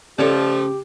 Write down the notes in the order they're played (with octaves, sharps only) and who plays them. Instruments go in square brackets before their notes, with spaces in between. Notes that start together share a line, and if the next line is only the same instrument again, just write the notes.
[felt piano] C#3 [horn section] F3 A3 [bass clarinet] G4 [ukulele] A4 C#5 D5